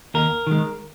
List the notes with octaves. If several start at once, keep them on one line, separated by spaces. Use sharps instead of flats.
D#2 A#4
D#3 G#3